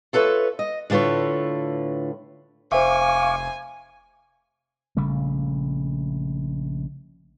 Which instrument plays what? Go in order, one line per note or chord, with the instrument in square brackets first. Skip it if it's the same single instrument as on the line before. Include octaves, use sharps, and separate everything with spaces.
[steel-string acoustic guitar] F4 A4 B4 C#5 E5
D#5
A2 D3 F4 B4 C#5
[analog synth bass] F1 [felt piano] C5 E5 [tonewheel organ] F5 C#6 D6 [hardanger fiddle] G#5
[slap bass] A#1 C#3 G3 A3